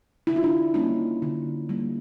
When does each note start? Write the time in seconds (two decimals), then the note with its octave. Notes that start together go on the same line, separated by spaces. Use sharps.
0.27 D3 E4
0.36 F4
0.43 D4 E4
0.74 G3 A#3 C#4 D#4
1.22 D3
1.69 G3 A#3